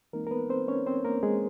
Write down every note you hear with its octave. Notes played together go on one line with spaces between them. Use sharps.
E3 G#3 A#3 C4 D#4 A#4
A#4
B3 B4
C4 C5
C#4 C#5
C4 C5
A#3 A#4
G#3 G#4